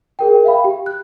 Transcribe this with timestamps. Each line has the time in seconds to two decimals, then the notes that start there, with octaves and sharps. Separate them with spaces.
0.19 G#4 A#4 G5
0.44 E5 F5 G5 B5
0.64 G4
0.86 F#6